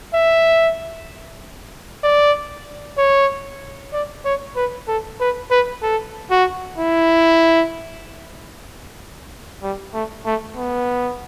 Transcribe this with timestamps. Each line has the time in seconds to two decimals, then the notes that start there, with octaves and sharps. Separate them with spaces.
0.14 E5
2.04 D5
2.98 C#5
3.93 D5
4.25 C#5
4.56 B4
4.88 A4
5.20 B4
5.51 B4
5.82 A4
6.30 F#4
6.78 E4
9.63 G3
9.94 A3
10.26 A3
10.56 B3